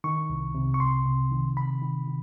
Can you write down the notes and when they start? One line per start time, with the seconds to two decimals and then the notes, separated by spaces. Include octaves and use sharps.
0.04 D#3 C#6
0.30 C2
0.55 C3
0.74 C#6
0.80 C2 C6
1.06 C3
1.31 D#3
1.57 C3 B5
1.82 D#3
2.07 D#3